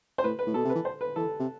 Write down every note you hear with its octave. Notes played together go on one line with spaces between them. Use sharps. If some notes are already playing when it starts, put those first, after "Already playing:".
C5
A2 B4
B4
A2
B2 A4
C3
B4
E3
C5
B4
E3 A4
C3